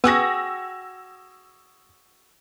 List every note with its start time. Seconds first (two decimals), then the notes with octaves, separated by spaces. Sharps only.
0.04 B3 F#4 G#4 G5 E6 A#6